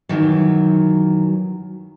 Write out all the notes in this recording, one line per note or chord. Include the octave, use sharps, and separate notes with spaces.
F#2 D#3 E3 F#3